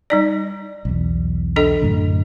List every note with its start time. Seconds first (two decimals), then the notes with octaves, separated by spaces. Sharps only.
0.10 G3 D#4 D5
0.85 B1 E2
1.56 D4 A4 D#5
1.82 F#2 A2 D3